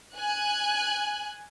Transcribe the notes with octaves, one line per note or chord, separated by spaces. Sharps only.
G#5 F#6